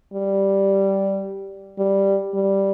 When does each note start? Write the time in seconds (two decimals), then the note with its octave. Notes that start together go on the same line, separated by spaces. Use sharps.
0.13 G3
1.79 G3
2.34 G3